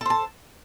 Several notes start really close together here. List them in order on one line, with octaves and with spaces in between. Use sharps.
A4 C5 A5